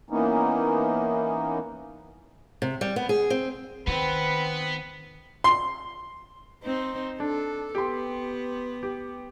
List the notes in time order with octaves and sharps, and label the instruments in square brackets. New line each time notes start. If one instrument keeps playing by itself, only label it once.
[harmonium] E3 A#3 B3 C#4 D#4
[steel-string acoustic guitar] C3
G3
B3
G#4
C4
[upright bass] D#3 [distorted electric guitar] B3 [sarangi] C4 [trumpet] B4
[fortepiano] C6
[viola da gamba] C4 D#4 C5
[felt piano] D4 [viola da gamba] A4
[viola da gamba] B3 [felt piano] G4 C6
[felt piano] G4